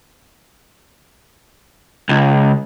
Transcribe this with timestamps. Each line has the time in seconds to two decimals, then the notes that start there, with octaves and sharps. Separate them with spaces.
2.09 C#2